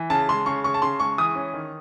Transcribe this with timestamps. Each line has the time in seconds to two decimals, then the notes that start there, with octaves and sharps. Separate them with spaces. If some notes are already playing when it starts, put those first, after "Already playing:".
Already playing: E3
0.10 C#3 A5
0.29 G#3 C6
0.46 C#3 C#6
0.64 C#3 C#6
0.74 A5
0.82 C#3 C6
1.00 G#3 C#6
1.18 E3 D#6
1.35 C#4
1.53 D#3